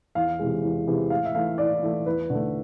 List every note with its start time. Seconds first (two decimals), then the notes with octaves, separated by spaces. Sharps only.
0.15 E2 F5
0.39 C3 E3 G#3
0.64 E2
0.87 C3 E3 G#3
1.10 A2 F5
1.25 E5
1.35 E3 A3 F5
1.58 A2 D5
1.82 E3 A3
2.06 E2 B4
2.30 D3 A3